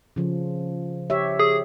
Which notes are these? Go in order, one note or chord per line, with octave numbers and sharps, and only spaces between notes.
C#3 F3
G4 C#5 E5
G#4